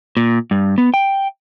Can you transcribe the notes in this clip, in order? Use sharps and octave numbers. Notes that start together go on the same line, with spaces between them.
A#2
G2
B3
G5